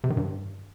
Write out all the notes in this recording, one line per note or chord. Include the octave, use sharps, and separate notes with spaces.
C3
D#3
G2